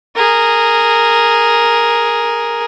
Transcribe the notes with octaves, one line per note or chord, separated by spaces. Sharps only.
G#4 A#4